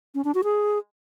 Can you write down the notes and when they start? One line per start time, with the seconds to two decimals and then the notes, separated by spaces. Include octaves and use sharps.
0.15 C#4
0.24 D4
0.35 F#4
0.44 G#4